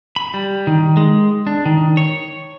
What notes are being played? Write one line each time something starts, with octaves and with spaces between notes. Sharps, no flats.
B5
G3
D#3
G#3
D4
D#3
C#5